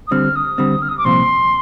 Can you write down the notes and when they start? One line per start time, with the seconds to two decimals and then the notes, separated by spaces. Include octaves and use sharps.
0.07 D#6
0.11 D3 G3 C4 F6
0.35 D#6
0.58 D3 G3 C4
0.82 F6
0.89 D#6
0.97 D6
1.04 C2 A#2 F3 C4 C6